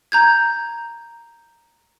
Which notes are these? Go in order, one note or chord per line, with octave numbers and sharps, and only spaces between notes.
A#5 G6 G#6